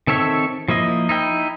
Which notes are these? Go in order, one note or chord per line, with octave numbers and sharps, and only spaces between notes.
D#3 C4 A4 C#5 E5
F3 A#3 E4 D#5
D#4 E4 G5